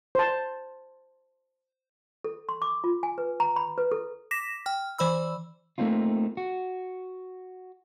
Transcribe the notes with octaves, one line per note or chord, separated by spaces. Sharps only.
C5 A5
A4
C6
D6
F4
G#5
B4
A#5
B5
B4
A4
D6 A#6 B6 E7
G5 F6
E3 C5 D5 B5 E6
A3 A#3 C4 D#4 F4
F#4